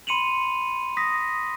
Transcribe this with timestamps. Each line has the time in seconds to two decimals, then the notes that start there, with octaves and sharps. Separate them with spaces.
0.07 B5 C6 C#7 D#7 F7 F#7
0.97 D#6 A#6 B6